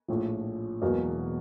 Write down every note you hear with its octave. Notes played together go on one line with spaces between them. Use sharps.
A#1 A2 F3
E1 E2 B2 F#3 A#3